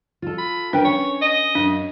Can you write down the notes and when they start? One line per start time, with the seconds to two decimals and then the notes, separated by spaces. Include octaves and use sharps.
0.22 F4 A4
0.38 B5
0.73 D4 A#4 B4 G5
0.85 C#4 C#5
1.21 D#5
1.55 F#2 D4